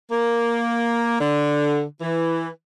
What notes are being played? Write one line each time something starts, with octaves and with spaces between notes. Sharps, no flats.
A#3
D3
E3